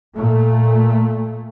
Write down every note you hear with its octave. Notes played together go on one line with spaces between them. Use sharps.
A#2 A3